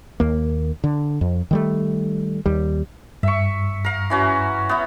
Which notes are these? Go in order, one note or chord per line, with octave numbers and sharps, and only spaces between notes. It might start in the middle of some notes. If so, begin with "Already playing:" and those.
D#2 A#3
D3
F2
D#3 G3 A3
D#2 G3
G2 E5 C#6
A#4 F5
E3 C#4 F#4
B3 E4